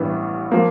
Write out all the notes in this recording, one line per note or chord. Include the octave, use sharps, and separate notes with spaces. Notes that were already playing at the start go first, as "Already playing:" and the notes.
Already playing: A1 G2 E3 G3 B3
F3 A#3